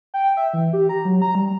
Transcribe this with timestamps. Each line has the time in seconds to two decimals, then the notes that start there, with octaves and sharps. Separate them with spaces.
0.14 G5
0.37 E5
0.54 E3
0.73 G4
0.89 A#5
1.05 F#3
1.22 A#5
1.35 G3